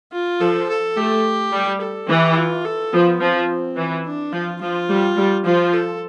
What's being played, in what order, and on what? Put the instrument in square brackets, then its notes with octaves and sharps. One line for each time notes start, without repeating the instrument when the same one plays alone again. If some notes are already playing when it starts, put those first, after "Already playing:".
[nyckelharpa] F4
[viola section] F3 [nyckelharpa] A4
[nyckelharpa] A4
[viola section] A3 [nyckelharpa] G4
[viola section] G3
[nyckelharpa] A4
[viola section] E3 [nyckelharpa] G4
[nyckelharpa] F4
A4
[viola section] F3 [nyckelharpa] B3
[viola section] F3 [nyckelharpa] C4
[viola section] E3
[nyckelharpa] D4
[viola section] F3 [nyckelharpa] F4
[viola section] F3 [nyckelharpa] F4
[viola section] G3
G3
[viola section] F3 [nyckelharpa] F4
[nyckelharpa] A4